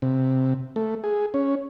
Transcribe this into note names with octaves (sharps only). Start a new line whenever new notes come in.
C3
A3
G#4
C#4